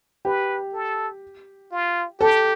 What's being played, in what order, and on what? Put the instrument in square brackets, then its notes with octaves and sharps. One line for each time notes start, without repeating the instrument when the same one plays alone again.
[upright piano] G4 [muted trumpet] B4
[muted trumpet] A4
F4
[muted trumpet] G4 [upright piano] A4